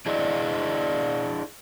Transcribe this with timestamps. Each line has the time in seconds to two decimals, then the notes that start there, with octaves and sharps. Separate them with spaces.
0.06 D4 E4 G#4 D5 D#5